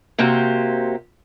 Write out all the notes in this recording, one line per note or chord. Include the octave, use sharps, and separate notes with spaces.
C3 A#3 C4 F#4 G4